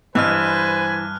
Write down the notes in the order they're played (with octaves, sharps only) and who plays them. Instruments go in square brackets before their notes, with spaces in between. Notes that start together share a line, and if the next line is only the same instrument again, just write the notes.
[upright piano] G2 [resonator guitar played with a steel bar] E3 D#5 [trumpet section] B4 C5 G#5 [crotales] F6 F#6